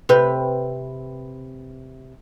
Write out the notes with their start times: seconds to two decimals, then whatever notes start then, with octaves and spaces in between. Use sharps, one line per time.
0.09 C3 G4 B4